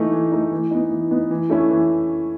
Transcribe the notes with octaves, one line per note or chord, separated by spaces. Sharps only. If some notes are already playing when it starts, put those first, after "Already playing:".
Already playing: E3 A3 D#4
E3
A3 D#4
E3
B3 D#4
E3
B3 D#4
E3
A3 C#4 E4
E3